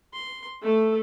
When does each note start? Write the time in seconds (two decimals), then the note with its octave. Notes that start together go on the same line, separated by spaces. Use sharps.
0.13 C6
0.62 A3 A4